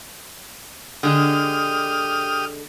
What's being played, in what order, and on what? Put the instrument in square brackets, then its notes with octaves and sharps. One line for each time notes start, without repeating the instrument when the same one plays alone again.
[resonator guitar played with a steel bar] D3 G#3 [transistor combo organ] G4 D#6 F6